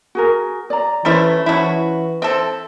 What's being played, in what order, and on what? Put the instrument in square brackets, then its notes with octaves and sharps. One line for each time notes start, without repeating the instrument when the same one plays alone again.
[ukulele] F#4 G#4 A#4
D5 A#5
[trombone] E3 [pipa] G3 A3 E4 [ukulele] C#4 C5 E5
[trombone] E3 [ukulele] C#4 C5 A5 [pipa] E4 F#4
[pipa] C4 A4 [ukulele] E5